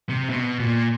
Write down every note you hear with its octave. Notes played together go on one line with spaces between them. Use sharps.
C3
B2
A#2